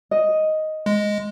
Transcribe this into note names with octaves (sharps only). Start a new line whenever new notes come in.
D#5
G#3